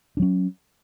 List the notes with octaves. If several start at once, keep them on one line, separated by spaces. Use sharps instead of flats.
F#3 C#4 D4